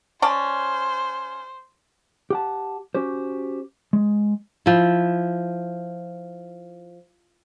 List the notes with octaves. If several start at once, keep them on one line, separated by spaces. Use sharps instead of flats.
C#4 C5 D5 A5
G4 F#5 A5
C#4 F#4 G4 C5
G#3
F3 E4